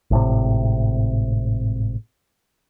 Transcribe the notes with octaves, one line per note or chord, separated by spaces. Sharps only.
G#1 A2 C3